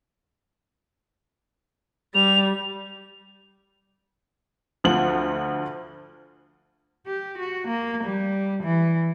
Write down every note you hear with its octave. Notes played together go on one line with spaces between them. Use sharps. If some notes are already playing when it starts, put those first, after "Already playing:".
G3 F7
D2 F3 F#5 F#7
G4
F#4
A#3
G3
E3